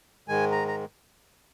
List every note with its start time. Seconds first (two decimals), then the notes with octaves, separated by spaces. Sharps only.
0.28 G#2 D#3 G#3 G#5
0.52 A#5
0.68 A#5